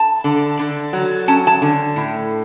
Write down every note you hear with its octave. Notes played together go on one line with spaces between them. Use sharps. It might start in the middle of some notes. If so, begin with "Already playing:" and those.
Already playing: A5
D3
D3
F#3
C#4 A5
A5
D3
A2